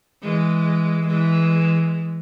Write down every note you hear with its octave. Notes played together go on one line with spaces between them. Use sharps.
E3 G#3
E3 G#3